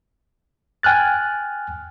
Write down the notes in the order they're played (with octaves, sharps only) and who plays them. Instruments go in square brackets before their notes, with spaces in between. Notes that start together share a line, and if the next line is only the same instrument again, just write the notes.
[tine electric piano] G5 G#5 F6 F#6 A6